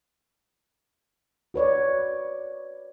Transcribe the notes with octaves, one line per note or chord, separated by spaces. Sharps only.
F#4 B4 C#5 D5